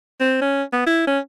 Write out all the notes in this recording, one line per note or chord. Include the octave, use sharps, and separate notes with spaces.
C4
C#4
B3
E4
C#4